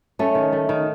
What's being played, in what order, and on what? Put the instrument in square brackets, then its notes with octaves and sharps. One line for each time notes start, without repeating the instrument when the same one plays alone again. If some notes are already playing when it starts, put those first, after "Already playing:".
[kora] A3 [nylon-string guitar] C#4
[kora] D#3
A3
D#3